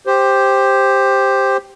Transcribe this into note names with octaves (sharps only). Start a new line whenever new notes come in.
G4 C5